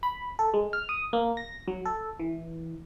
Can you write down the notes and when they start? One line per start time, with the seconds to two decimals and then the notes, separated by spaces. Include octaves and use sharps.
0.03 B5
0.39 A4
0.54 G#3
0.73 F6
0.89 D#6
1.13 A#3
1.37 A#6
1.68 F#3
1.85 A4
2.19 E3